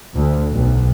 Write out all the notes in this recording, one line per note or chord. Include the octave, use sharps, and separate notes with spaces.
D2
B1